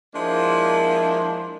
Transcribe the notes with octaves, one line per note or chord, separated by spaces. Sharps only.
F3 G#3 A#3 D4 E4